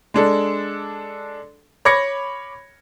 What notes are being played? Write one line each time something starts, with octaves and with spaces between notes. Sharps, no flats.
G#3 D4 A4
C#5 B5 D6 G#6 A#6 C#7